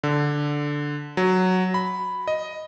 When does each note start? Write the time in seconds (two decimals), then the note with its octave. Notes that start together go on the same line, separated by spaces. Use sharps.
0.03 D3
1.17 F#3
1.74 B5
2.28 D#5